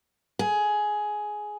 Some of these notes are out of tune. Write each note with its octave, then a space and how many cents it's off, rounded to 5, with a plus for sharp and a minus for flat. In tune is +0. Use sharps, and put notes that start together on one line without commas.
G#4 +10